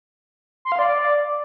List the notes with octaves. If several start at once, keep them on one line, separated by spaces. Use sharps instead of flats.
C6
F5
D5